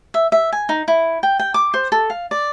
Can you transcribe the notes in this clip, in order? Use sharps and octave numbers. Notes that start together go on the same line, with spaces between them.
E5
E5
G#5
D#4
E4
G5
G5
D6
C5
A4
F5
D5